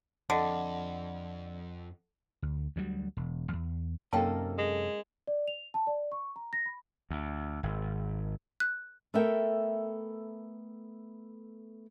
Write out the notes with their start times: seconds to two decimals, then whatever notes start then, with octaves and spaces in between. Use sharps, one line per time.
0.30 F2 D3 A4 D#5 F#5
2.42 D2
2.76 D2 F#3 G3
3.17 E1
3.53 E2
4.13 F#2 C3 A#3 C#4 D#4 A4 G5 A5
4.58 G#3
5.27 D5
5.48 F7
5.74 A5
5.87 D5
6.12 C#6
6.36 A#5
6.53 A#6
6.66 B5
7.10 D2
7.63 G#1
8.60 F#6
9.14 A3 B3 A4 A#4 E5 G5